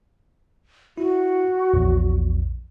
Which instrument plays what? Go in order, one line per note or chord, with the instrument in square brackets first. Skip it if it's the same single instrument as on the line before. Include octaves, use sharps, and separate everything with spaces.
[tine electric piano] E4 [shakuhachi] F#4
[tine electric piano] A#1 E2